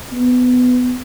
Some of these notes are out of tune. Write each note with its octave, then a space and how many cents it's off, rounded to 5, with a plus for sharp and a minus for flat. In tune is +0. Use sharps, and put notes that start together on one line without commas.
B3 +15